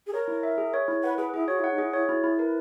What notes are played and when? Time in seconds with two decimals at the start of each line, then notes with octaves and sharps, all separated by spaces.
0.07 G#4
0.13 A#4 C#5
0.28 E4
0.43 E5
0.58 G#4
0.74 C#5
0.88 E4
1.03 B4 F#5
1.18 G#4 B4
1.33 E4 G#4
1.48 F#4 C#5
1.59 E4
1.64 F#5
1.71 D#4
1.78 E4 G#4
1.93 E4 C#5
2.09 E4 F#4
2.24 E4 G#4
2.39 A#4 B4